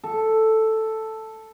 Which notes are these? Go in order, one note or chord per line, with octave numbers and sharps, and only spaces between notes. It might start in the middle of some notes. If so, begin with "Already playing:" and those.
A4